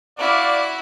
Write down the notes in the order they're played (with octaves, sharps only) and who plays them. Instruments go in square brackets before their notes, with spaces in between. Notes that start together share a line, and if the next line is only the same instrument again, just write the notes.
[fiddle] E4 F#4 [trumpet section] D5 F5